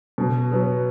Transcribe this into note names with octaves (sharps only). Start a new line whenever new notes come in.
B2
F#3 B3